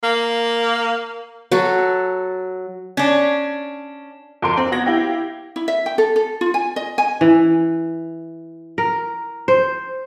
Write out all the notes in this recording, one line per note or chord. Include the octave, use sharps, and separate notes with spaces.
A#3
F#3 F#4 A4
C#4 D4
F2 A#4 C6 D7
C4
B3 F#4 G#6 A#6 F#7
E4 G4 F5 G5
E4
E5
G5
A4
A4
F4
G#5
D#5
G#5
E3
A#4
C5